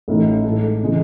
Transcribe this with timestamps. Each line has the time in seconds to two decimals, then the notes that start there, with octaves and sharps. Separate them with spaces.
0.08 A1 A2 E3 A3 D#4
0.44 A2 G#3 D#4 A4
0.83 C#3 E3 G#3